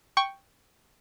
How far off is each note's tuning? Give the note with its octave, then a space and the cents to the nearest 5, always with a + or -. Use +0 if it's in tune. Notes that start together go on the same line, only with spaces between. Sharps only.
G5 +0 C#6 +0